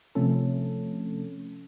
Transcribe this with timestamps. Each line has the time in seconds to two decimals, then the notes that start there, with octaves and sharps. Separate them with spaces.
0.15 C3 F3 A3 C#4 A4